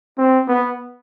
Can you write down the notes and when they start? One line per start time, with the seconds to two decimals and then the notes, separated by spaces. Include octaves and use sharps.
0.18 C4
0.48 B3